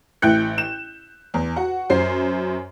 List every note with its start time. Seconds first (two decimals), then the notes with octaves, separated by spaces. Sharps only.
0.22 A1 E4 G5 F#6 G6 C#7
0.58 E7
1.34 E2
1.56 F#4 F#5
1.90 F#2 C5 C7